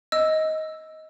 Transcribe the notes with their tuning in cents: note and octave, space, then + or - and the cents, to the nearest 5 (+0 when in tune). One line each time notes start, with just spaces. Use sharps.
D#5 +15 E6 +0